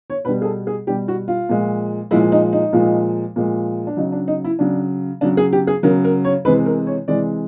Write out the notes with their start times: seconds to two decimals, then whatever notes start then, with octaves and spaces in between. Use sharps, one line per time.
0.10 C#5
0.25 B2 G3 B4
0.42 G#4
0.45 A4
0.67 G#4
0.87 B2 G3 G4
1.08 F#4
1.28 F4
1.49 A#2 F3 G#3
2.11 A#2 F3 G#3 E4
2.32 D#4
2.53 D#4
2.73 A#2 F3 G#3
3.36 A#2 F3 G#3
3.87 D4
3.97 C#3 F#3 D#4
4.12 D4
4.28 D#4
4.44 E4
4.59 C#3 F#3 D4
5.21 C#3 F#3 D4
5.37 G#4
5.53 G4
5.67 G#4
5.83 C#3 F#3 A#4
6.04 A#4
6.25 C#5
6.45 C3 E3 G#3 B4
6.66 A#4
6.87 C#5
7.08 C3 E3 G#3 D5